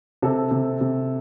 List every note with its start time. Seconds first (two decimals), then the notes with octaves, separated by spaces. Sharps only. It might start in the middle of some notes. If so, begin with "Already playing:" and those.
0.22 C3 A4
0.51 C3
0.81 C3